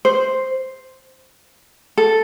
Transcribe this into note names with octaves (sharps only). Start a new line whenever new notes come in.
C5
A4